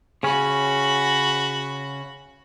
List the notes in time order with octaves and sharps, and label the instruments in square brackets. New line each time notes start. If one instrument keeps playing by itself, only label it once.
[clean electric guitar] C#3 C#4 [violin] F#4 B5